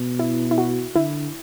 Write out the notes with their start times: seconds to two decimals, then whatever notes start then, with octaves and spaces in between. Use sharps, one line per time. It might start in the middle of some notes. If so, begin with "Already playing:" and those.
Already playing: B2
0.19 E4
0.51 E4
0.58 F#4
0.95 D3 E4